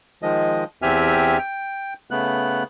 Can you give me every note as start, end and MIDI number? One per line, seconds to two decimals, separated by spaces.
0.23 0.64 51
0.23 0.64 53
0.23 0.64 56
0.23 0.64 75
0.82 1.38 40
0.82 1.38 60
0.82 1.38 67
0.82 1.38 76
0.82 1.38 80
0.82 1.38 89
1.39 1.94 79
2.11 2.63 49
2.11 2.63 57
2.11 2.63 59
2.11 2.63 90